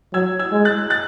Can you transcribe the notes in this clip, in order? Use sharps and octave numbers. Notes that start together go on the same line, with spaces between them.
F#3 E6 G#6
E6 G#6
G#3
F#6 A6
F#6 A6